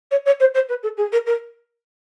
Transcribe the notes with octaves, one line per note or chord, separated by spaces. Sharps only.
C#5
C#5
C5
C5
B4
A4
G#4
A#4
A#4